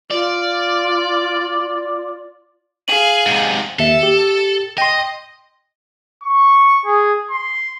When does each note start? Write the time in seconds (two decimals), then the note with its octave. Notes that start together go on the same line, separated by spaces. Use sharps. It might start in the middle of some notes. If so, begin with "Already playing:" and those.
0.10 F4 D5
2.88 G#4 F5 D#7 F#7
3.26 G#2 C3
3.79 D#2 A4 E5
4.03 G4
4.78 D#5 G5 C6
6.23 C#6
6.86 G#4
7.31 C6